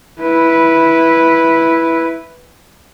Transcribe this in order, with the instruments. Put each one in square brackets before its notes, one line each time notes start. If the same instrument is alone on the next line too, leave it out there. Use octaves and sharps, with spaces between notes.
[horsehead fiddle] E4 B4